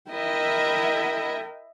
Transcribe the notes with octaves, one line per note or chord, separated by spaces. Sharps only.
E4 A#4 D#5 E5 G5